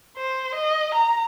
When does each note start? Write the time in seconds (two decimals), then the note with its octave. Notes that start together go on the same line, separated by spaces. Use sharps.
0.17 C5
0.55 D#5
0.94 A#5